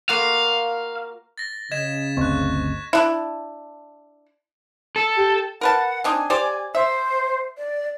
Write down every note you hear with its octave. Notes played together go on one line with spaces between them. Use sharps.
A#3 F4 F#4 F5
A6 A#6
C#3 D#5 G#6 B6 E7
G1 D2 C4 D#5 C#6 F#6
D4 E4
A4
G4
A#4 B4 F#5 A5
C4 D4 D#4 G#5
G4 C5 D5
C5 E5
D5